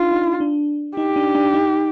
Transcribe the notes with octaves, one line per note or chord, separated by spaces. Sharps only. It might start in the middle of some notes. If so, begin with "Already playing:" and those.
Already playing: D4 D#4 F4
D#4
D4
D#4 G4
D4
D4
D#4